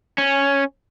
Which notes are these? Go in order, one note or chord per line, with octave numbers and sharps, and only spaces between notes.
C#4